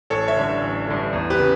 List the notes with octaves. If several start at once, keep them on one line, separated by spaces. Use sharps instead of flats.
A1 A4 C#5
C#5 E5
G2 D3
A1
G2 D3
E2
G4 B4
C#3